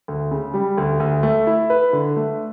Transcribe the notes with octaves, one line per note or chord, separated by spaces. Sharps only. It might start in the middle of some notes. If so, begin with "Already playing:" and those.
D2
C#3
G3
D2
D2
A3
E4
B4
D3
A3